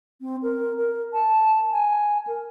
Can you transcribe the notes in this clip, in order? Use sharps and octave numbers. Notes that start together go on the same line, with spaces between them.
C4
A#4
A#4
A5
G#5
A#4